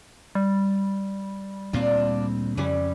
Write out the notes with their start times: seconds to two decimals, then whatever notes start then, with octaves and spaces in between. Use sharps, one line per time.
0.35 G3
1.73 D2 A#2 C4 D4 F4
2.57 F2 C#3 E3 G3 C#4